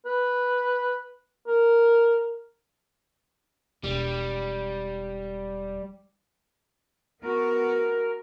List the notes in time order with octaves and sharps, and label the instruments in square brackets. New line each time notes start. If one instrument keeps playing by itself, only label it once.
[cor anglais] B4
A#4
[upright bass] E1 [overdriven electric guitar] G3
[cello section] B3 F#4 [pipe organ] A#4